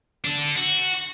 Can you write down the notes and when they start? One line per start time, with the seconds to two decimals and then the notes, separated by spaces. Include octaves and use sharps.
0.25 D4 A4
0.56 F#4